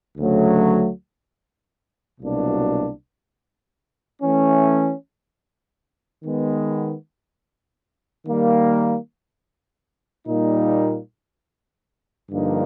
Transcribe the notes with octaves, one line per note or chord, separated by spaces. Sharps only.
D2 C#3 F#3 A3
C2 B2 F#3 A#3 D4
E3 A3 C#4
D#3 G#3 B3
D#3 G3 A#3
A#2 G3 A#3 D#4
G2 D3 F3 A#3 D#4